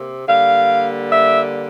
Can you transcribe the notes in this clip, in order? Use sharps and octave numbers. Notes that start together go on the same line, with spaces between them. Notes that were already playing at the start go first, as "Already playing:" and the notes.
Already playing: C3 A#3
D3 G3 A#3 F5
E5